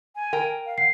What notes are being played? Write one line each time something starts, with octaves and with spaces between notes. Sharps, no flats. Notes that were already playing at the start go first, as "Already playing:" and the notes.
G#5
A#4 G5
F5
F#5 C7